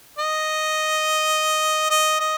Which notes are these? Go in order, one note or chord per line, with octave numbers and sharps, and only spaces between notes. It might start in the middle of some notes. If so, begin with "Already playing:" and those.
D#5
D#5
D#5